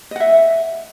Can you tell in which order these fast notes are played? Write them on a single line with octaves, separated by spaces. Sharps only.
D#5 F#5 E5